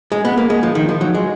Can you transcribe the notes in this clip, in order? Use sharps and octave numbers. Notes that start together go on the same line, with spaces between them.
G#3
B3
A#3
G#3
F3
D#3
F3
F#3
G#3